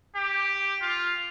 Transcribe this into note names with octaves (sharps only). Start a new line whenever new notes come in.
G4
F4